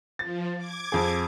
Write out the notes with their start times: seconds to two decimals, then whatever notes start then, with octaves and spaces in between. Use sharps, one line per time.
0.19 F3 A6
0.57 D6 G#6
0.92 F2 G#4